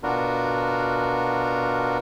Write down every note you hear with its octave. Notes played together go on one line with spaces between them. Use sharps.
B2 D4 F4 F#4 A#4